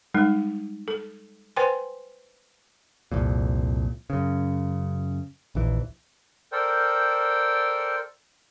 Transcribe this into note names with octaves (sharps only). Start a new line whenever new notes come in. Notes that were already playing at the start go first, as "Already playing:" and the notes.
G3 G#3 D#4
A4
B4 C5 G5 G#5 C6
C2 F2 A#2
F#2 C#3
A#1 D#2 E3
A4 A#4 C5 D5 G5